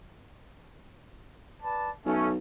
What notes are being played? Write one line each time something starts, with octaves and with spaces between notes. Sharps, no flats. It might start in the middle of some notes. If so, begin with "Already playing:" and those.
B4 D5 A5
B1 A3 C#4